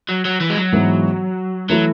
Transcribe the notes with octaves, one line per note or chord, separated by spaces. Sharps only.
F#3
F#3
E3
G#3
F#3
G#2 E3 B3
E3 F#3 A3 E4